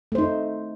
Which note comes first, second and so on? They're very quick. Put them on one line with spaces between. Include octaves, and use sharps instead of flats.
A3 C5 D#4